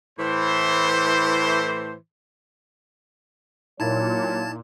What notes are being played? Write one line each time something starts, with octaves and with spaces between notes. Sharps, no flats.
A2 E3 C5
A#2 F#3 D#4 E4 C#5 A5 G#6 A6